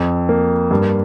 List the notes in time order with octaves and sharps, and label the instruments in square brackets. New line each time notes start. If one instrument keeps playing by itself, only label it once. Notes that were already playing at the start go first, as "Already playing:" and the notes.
Already playing: [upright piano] F2
A#3
G2